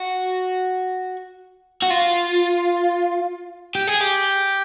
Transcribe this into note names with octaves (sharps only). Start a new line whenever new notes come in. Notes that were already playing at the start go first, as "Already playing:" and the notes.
Already playing: F#4
F#4
F4
G4
G#4
G4